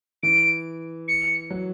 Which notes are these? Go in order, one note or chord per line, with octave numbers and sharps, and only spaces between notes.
E3 D7
C#7
F#3